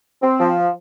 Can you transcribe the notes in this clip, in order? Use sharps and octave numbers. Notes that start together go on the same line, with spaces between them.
C4
F3